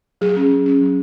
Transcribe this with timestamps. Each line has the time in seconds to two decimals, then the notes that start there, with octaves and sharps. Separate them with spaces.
0.21 F#3 G#4
0.37 C#4
0.51 F#3
0.66 C#4
0.81 F#3